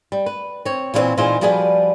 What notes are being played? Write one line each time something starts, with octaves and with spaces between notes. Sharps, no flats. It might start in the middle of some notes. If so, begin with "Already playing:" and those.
G3
B4
C4 C#5
A#2 E3 G3 G#3 C4 C#4
A#2 E3 D#4 F4 G#4 C5
F3 G3 F#4 G#4 B4 D5